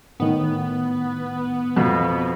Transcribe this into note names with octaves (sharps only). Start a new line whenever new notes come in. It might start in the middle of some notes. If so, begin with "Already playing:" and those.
A2 D#3 B3
F2 B2 B3